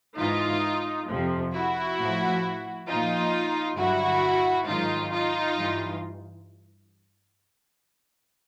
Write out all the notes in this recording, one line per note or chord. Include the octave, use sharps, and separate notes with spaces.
G#2 E3 D#4 F4
F2 C3 F3
E4 F#4
A2 F3
A#2 F3 D#4 F4
G2 D3 F#3 E4 F#4
G#2 D#3 F#3 D#4 F4
D#4 F4
G2 E3